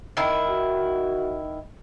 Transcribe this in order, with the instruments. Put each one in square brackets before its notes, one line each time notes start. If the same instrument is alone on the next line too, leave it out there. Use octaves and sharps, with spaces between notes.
[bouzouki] D#3 E4
[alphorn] F#4